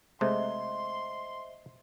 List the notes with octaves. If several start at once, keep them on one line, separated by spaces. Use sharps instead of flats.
C3 G#3 A3 C5 D#5 E5 C6